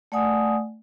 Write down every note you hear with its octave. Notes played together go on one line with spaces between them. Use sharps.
A3 D5 F#5 G#5 D#6